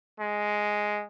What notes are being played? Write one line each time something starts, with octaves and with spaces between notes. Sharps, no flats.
G#3